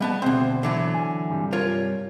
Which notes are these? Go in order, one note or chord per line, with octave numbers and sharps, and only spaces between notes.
G3 B3 D#5 F#5 A5
D2 B2 F3 C4 C5
D3 E3 F#3
G#5
G2 C3 G3
F4 A#4 C#5